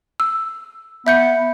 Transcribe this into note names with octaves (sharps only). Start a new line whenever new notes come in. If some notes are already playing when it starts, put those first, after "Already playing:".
E6
B3 E5 G6 C#7